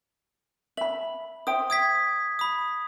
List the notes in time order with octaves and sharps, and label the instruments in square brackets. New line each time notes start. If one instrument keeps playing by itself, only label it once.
[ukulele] E5 B5 [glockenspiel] F#7
[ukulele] C5 E5 G5 [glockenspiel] D#6
[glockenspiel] D#6 G#6 B6
B5 D#6